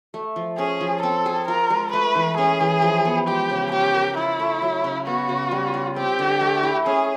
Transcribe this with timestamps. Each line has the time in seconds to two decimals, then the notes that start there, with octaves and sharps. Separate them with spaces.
0.14 A3
0.36 F3
0.58 C#4 G#4
0.81 F3
1.03 C4 A4
1.26 G#4
1.48 F4 A#4
1.70 G#3
1.92 A3 B4
2.15 E3
2.38 C#4 G#4
2.61 E3
2.82 F3
3.05 B3
3.27 G#3 G4
3.50 C#3
3.72 C#4 G4
3.95 A#4
4.17 E4 F4
4.39 A3
4.62 F#3
4.84 C#3
5.06 B3 F#4
5.29 C#3
5.51 G3
5.74 F4
5.96 C4 G4
6.19 D3
6.41 A3
6.63 E4
6.86 C#4 G#4